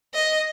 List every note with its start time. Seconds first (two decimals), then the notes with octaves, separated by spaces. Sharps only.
0.14 D#5